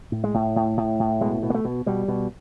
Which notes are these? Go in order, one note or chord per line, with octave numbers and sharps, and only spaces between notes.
A2
G#3
A2
A2
A2
A2
B2 G#3
B2
A#3
A3
B2
B2 G3
B2